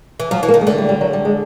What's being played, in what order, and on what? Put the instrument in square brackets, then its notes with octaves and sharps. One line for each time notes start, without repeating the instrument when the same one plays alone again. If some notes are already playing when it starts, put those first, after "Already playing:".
[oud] E3
[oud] F3 [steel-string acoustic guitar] F#3
[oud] E3
[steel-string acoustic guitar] A#3
[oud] D#3
[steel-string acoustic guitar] G#3
[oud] D3 [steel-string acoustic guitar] A3
[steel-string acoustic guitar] G3
G3
F#3
G3
G#3